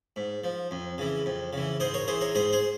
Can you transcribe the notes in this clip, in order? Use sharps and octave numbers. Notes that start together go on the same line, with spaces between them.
G#2
F3
F2
C#3 E3
F2
C#3 E3
G#2 G#4 C5
A#4 C#5
E3 G#4 C5
A#4 C#5
G#2 G#4 C5
G#4 C5